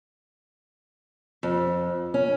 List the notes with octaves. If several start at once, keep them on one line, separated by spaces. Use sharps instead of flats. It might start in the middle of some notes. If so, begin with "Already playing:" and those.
F2
C#4